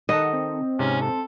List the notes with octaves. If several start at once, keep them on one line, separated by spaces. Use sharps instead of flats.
D#3 D#4 A4 D#5 F#5
C4
G#2 C3 C#4 F6
C4 A4